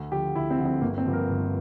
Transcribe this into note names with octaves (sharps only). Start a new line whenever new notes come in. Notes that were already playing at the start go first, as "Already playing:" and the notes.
Already playing: D2
D3 F3 G4
D2 E4
C4
D3 F3
C4
G1 A#3
C4
G2 D3 F3
A#4
G1